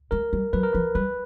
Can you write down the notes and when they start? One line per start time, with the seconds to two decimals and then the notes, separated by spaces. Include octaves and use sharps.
0.11 G#3 A#4
0.33 G3
0.53 F#3 B4
0.63 A#4
0.73 F3 B4
0.95 G3 B4